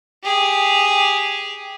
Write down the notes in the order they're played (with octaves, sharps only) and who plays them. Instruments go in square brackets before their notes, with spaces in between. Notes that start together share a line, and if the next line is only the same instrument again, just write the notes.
[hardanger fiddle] G4 G#4